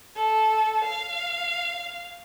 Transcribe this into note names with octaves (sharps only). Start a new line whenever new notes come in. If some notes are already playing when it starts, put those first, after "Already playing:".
A4
F5